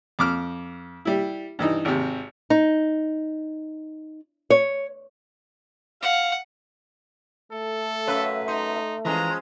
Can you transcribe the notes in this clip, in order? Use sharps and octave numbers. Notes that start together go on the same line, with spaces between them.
F2 D6 F6
G3 E4
G2 E3 D#4
G#1 C3
D#4
C#5
F5 F#5
A3 A4
F#2 B4 C#5 F5 E6
D#4 C6
E3 F3 G#3 C#4 A#5